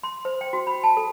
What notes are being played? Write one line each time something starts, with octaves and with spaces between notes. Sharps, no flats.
C6
C5
G5
F#4
B5
A5
A4